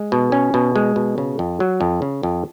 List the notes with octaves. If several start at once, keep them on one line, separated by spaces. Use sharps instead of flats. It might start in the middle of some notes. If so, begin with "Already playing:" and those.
Already playing: G#3
B2
C#4
B2
G#3
B2
C#3
F2
F#3
F2
C#3
F2